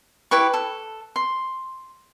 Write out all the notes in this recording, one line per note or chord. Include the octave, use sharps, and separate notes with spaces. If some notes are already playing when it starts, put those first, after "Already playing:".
E4 G4 B4 C#6
A4
C6